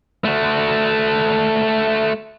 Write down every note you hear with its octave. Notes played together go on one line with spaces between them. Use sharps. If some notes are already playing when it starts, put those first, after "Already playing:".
A3 F#4